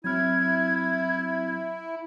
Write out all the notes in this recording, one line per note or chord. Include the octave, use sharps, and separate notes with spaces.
F#3 C4 E4 F6 G#6